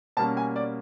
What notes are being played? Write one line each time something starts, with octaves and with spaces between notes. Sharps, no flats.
B2 G3 A#3 C#4 A5
G#5
D5